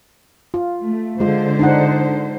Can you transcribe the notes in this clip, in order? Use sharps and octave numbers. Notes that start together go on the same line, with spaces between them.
F4
A3
D3 G#3 F4 C5
D4 D#4 F#5